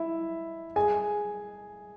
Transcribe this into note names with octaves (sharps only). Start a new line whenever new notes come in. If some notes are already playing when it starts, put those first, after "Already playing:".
Already playing: E4 E5
G#4 G#5